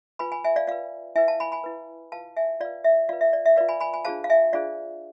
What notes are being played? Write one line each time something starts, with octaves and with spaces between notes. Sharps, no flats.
F4 B4 G#5 B5
G#5 B5
E5 G#5
D5 F5
F4 B4 D5 F5
E4 B4 E5 G#5
F5 A5
G#5 B5
G#5 B5
E4 B4
F4 B4 F5 A5
E5 G#5
F4 B4 D5 F5
E5
F4 B4 D5 F5
E5
D5
E5
F4 B4 D5 F5
G#5 B5
G#5 B5
G#5 B5
D4 F4 G#4 C5 F5 A5
F5
E5 G#5
D4 F4 G#4 C5 D5 F5